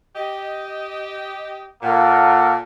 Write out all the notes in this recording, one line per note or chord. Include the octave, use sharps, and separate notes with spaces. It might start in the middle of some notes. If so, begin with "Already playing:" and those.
G4 D#5
A#2 A#3 A4 F#5